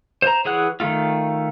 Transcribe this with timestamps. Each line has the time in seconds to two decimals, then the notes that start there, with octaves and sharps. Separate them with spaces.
0.22 C5 A#5
0.45 E3 G#4 C#5 F#5 F#6
0.80 D#3 G3 A3 F4